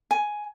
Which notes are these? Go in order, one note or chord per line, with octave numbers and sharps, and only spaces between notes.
G#5